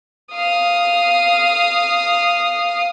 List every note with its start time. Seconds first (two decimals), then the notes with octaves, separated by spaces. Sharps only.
0.33 F5 D#6